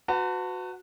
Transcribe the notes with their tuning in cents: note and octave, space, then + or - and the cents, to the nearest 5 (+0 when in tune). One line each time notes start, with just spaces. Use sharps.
F#4 -15 B4 +25 A5 +35